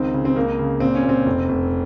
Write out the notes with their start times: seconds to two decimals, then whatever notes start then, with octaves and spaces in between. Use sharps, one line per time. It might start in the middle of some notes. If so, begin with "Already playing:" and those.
Already playing: C#2 D#3 C4
0.14 C#3
0.25 C4
0.36 C#2 A#3
0.59 C#3
0.80 A#2 C4
0.95 C#4
1.03 A#2
1.09 C4
1.26 F1
1.49 F1